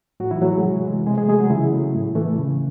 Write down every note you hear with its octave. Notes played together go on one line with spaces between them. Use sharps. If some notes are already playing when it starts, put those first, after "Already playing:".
A2 F#3 F#4
E3 E4
F#3 A3 F#4
G#3 G#4
C3
E3 G#3
C3 G#3 G#4
G#3 G#4
F#3 G#3 A3 G#4
F#3 F#4
C#3 E3 E4
F#3 A3
A2
E3 A3
C#3